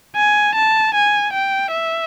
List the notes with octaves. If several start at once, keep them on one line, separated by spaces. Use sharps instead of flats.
G#5
A5
G#5
G5
E5